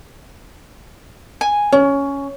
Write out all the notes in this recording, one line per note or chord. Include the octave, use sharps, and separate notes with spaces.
G#5
C#4 C#5